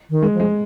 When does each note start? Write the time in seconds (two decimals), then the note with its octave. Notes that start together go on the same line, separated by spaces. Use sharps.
0.10 D#3
0.22 G#3
0.34 F3
0.40 G#3